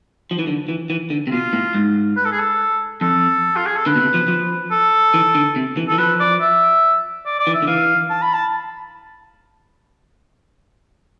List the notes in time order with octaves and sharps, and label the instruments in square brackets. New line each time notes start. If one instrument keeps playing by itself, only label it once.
[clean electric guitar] F3
E3
D3
E3
E3
D3
C3
[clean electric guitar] B2 [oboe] F4
[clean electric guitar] A2
G#2
[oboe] B4
A4
G#4
A4
[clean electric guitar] F2 [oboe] A4
[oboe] F4
G#4
A4
[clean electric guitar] D3 [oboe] B4
[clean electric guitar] B2
C3
F3
F3
[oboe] A4
[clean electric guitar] E3
D3
C3
E3
[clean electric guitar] E3 [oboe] A4
[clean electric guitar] F3 [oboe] B4
[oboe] D5
E5
D5
D5
[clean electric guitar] E3
[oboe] E5
[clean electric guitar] D3
[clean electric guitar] E3 [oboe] F5
[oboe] A5
B5
A5